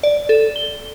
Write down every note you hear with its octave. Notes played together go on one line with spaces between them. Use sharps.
D5
A4
G7